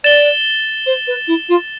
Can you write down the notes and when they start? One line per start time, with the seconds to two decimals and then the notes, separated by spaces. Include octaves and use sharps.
0.04 D5 A6 E7 G7
0.86 C5
1.07 B4
1.27 E4
1.49 F4